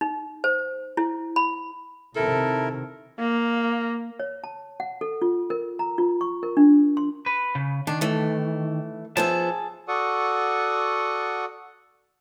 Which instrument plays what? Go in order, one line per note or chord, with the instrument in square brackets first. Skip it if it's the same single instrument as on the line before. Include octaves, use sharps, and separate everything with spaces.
[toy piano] D#4
C5
E4
B5
[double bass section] C3 D#3 [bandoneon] E4 A#4 [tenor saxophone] A4 [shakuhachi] A5
[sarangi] A#3
[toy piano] C#5
A5
F#5
A4
F4
A#4
A#5
F4
C#6
A#4
D4
C6
[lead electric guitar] B4
C#3
[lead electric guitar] D#3 [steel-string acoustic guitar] D4
[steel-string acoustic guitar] E3 A3
[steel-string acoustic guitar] F3 B3 E5 [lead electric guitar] G#4 A5
[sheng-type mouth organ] F#4 A4 D5 F#5 C#6 D#6